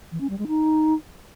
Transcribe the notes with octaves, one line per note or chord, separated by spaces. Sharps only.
E3
C#4
G3
G#3
D#4